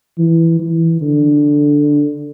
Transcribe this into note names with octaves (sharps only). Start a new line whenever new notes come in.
E3
E3
D3